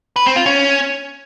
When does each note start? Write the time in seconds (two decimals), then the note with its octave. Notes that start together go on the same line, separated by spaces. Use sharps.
0.16 B4
0.26 C4
0.36 F4
0.46 C#4